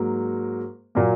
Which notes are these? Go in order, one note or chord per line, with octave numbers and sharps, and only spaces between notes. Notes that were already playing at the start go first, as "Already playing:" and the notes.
Already playing: G#2 F#3 A#3
A#2 F#3 A#3